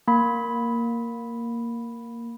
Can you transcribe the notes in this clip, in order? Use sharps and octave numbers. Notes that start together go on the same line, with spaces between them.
A#3 B5